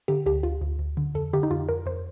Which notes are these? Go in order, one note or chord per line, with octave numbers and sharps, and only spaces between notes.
D3 G4
D2 G4
D2 F4
D2
D2
D3
F2 A4
D3 G4
D#4
F2 F4
F2 A#4
F2 C5